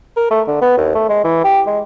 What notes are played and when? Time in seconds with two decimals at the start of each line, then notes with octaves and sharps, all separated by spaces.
0.16 A#4
0.31 A3
0.47 D3
0.61 B3
0.77 D#2
0.95 A3
1.09 G#3
1.24 E3
1.44 G4
1.66 G#3